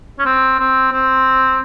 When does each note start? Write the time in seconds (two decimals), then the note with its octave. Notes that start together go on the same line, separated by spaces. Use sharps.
0.19 C#4
0.25 C4
0.59 C4
0.92 C4